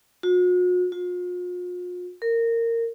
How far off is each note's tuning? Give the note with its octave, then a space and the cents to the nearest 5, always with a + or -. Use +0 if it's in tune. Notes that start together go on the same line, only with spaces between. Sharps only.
F#4 -45
F4 +40
A#4 -20